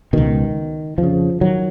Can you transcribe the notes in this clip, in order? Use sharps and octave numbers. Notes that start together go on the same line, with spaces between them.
C#2 B2 D#3
F2 F3
C#3
D#3 F#3